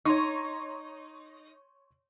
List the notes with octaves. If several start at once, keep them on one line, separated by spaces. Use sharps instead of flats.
D#4 C#5 C6 C#6